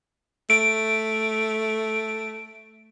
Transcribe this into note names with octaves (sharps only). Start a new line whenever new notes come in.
A3 D7